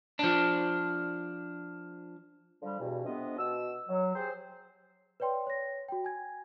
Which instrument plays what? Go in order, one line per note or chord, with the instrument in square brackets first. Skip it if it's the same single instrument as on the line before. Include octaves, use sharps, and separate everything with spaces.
[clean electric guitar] F3 D4
[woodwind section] D3 F3 G3
E2 G2 B2
F2 C3 B3 D4 D#5
B2 E6
F#3
G4 G#4 C5
[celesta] B4 C#5 D5 G5 C6
C#5 A#6
F#4 G5
G#5 G#6